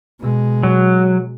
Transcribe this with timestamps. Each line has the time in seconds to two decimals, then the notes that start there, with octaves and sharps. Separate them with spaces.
0.20 B2 G#3
0.63 F#3